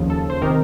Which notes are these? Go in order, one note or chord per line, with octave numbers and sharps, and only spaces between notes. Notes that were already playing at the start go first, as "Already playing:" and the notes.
Already playing: D#2 C#3 F3
A4
C5
C3 D#3 A#4